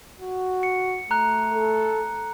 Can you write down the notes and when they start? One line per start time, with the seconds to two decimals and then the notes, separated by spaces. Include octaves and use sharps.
0.20 F#4
0.63 C#7
1.11 A3 A#5 F#6
1.54 A4